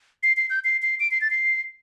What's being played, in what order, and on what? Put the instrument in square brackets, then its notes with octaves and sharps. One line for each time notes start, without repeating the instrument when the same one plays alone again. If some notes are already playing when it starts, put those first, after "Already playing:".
[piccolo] C7
C7
G6
C7
C7
D7
C7
A6
C7